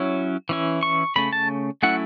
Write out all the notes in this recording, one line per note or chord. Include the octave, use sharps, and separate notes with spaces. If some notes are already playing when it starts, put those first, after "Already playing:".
Already playing: F#3 C#4 E4
E3 C#4 E4
C#6
C#3 A3 C#4 B5
A5
F#3 A3 C#4 E4 F#5